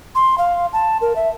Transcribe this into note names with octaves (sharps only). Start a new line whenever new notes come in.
C6
F5
A5
A#4
E5